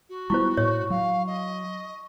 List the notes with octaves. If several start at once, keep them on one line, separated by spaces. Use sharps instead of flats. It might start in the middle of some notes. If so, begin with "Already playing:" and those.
F#4
G3 B3 E4 F4 C5 C#6
A2 C#5
F#3 F5
D#5